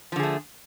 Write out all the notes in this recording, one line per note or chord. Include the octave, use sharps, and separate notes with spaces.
D3 F3 A3 G#4